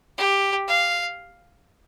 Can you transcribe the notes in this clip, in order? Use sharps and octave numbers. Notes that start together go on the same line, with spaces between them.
G4
F5